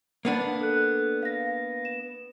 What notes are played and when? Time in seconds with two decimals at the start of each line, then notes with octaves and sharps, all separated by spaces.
0.25 A#3 B3 D4
0.61 A4 F#6
1.23 F5 A#6
1.85 E7